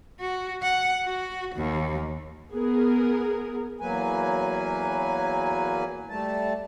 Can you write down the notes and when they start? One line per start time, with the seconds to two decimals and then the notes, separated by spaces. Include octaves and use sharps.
0.20 F#4
0.63 F#5
1.05 F#4
1.56 D#2
2.52 B3 G#4 A#4
3.81 E2 F#3 A#3 B4 G#5
6.09 G3 A3 A5